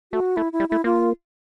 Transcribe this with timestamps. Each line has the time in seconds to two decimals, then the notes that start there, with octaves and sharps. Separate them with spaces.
0.12 A3 F#4
0.36 A3 E4
0.53 E4
0.60 G3
0.69 A3 E4
0.84 A#3 F4